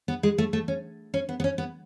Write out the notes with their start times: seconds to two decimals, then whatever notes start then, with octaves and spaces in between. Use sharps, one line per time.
0.08 B3
0.23 G#3
0.38 A3
0.53 A3
0.68 C#4
1.14 C#4
1.29 B3
1.40 B3
1.44 C#4
1.58 B3